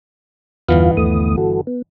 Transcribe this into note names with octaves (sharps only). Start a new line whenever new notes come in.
G1 E2 E3 B3 F4 F5
D#2 A3 D#6
F#4 A4
B3